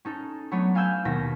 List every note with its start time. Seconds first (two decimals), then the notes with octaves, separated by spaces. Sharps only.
0.05 C#4 D#4 A4
0.51 F#3 A3 B3 D4 C#5
0.75 F5 G#5 E6 G6 G#6 E7
1.05 D#2 B2 A#6 B6